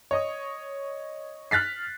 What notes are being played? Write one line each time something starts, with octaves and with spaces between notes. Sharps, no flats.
C#5 D#5 D#6
F6 F#6 A6 B6 C7